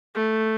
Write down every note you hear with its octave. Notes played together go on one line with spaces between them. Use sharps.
A3